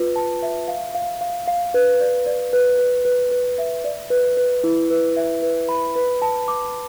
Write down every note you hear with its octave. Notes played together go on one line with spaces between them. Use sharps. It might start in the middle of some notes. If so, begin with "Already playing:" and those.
Already playing: F4 B4
A5
E5
F5
F5
F5
F5
B4
D5
D5
B4
B4
B4
B4
E5
D5
B4
B4
E4
B4
E5
B4
B5
B4
A5
D6